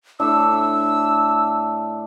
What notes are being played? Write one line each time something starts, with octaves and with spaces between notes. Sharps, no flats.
A2 D4 E6